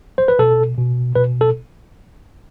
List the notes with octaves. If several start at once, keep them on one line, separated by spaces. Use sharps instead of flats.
C5
B4
B2 A4
B2
B2 B4
A4